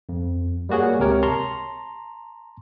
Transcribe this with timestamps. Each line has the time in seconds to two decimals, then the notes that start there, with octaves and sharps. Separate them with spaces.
0.09 F2
0.69 G3 A#3 F#4 G#4 C#5
0.99 C#2 C3 G4 A#4 C#5
1.23 A5 A#5 C6 C#6